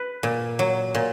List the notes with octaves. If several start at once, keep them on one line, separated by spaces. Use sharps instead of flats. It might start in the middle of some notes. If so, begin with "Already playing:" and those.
Already playing: B4
A#2
F#3
A#2